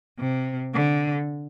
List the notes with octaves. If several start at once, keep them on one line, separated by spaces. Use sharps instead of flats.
C3
D3